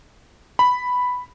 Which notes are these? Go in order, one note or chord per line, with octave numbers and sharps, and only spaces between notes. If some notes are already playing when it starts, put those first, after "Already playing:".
B5